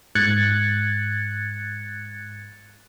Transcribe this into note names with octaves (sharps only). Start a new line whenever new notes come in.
G#2 F#6 G#6 A6 C#7